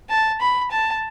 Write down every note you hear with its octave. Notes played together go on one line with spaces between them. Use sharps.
A5
B5
A5